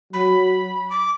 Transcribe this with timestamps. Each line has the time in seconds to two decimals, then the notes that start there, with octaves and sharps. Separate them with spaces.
0.13 F#3 B5
0.90 D6